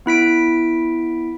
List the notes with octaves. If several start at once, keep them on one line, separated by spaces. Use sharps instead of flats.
B3 E4 B6 D7